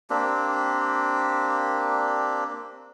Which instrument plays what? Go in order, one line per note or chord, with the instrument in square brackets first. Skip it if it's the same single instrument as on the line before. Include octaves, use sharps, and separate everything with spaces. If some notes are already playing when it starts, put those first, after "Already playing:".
[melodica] A#3 C4 D4 G4